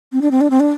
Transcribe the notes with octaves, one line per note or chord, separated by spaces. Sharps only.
C4
D4
C4
D4
C4
D4